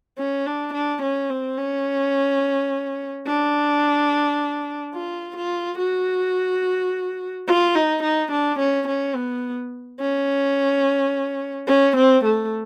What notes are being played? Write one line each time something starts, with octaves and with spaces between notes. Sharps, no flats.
C#4
D4
D4
C#4
C4
C#4
D4
F4
F4
F#4
F4
D#4
D#4
D4
C#4
C#4
B3
C#4
C#4
C4
A3